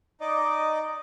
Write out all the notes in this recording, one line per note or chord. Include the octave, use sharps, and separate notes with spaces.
D#4 D5 D#5 D6